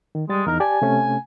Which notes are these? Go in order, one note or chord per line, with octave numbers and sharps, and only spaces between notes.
D#3
G3 G#3 A6
E2 D#4 A#4 A#5
G4 D5 G#5 A5
C3 A3 C#4